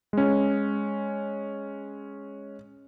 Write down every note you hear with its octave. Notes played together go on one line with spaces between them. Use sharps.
G#3 C#4